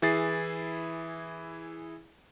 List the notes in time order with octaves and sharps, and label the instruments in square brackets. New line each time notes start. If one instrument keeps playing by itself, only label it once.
[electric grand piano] E3 E4 G#4 A6 C7